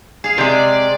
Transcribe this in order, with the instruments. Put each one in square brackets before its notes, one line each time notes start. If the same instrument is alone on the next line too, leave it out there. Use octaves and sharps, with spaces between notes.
[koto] G#4 F5
[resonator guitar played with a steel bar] C3 G#3 [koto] C#5 [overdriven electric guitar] D5